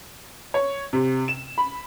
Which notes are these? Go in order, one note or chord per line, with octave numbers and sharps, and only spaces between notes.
C#5
C3
E7
B5